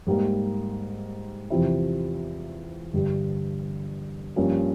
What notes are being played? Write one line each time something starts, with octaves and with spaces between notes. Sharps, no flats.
G#2 G3 A#3
E2 C3 F3 C4 E4
G1 G2 G3
G2 F3 A#3 C#4